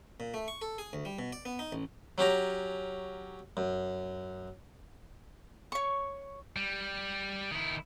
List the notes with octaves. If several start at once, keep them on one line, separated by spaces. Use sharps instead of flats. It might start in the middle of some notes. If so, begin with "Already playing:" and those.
A#2
A3
C#6
A4
G#4
D2
G3
B2
D5
B3
D#4
A1
F#3 C#4 G4 A#5
F#2
C#5 C#6
G3
D#3 E4